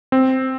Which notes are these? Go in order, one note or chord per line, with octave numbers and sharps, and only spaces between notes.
C4